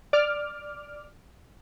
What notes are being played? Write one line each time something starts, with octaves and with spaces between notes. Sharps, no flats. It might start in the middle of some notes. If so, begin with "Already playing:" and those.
D5 D6 F6